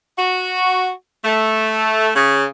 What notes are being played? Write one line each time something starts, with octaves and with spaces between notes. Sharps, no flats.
F#4
A3
C#3